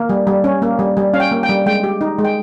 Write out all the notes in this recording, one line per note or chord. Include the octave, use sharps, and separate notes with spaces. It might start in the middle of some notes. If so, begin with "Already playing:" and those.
Already playing: A#3
G3
G3
C#4
A#3
G3
G3
C#4 F5
G5
A#3
G5
G3
G#3 G5
G4
D#4
G#3
G5